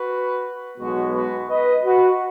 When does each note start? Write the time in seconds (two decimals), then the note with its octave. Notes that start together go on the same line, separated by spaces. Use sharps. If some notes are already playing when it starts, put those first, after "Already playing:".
Already playing: F#4 B4
0.78 B1 B2 G#3 B3 F#4
1.14 F#4 B4
1.49 B4 D#5
1.84 F#4 B4